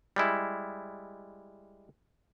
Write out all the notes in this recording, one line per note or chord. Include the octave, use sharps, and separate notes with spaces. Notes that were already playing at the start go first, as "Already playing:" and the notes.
G3 G#3 E4